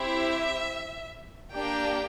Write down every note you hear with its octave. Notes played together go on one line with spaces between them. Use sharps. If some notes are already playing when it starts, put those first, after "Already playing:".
Already playing: C4 E4 G4 E5
A#3 D4 G4 G5